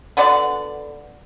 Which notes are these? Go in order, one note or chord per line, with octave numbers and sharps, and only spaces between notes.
D3 B3 F#4 D5